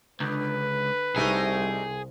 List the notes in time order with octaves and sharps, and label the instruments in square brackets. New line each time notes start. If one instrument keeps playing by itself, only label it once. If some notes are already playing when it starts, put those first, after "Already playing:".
[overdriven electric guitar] C#2 [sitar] D3 [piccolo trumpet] B4
[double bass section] C2 [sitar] A3 D#4 G4 [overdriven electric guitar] G#4